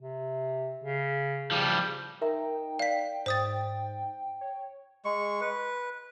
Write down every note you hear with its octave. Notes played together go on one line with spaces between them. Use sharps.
C3
C#3
C#3 F3 G3
D#4 A#4 E5 G5 A#5
D5 F5 B6
G#2 C5 D#6 A6
C#5
G#3 C#6
B4